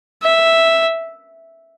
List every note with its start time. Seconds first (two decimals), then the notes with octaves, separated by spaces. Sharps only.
0.23 E5